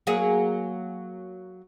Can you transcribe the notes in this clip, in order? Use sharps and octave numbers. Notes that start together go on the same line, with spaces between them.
F#3 A#3 G#4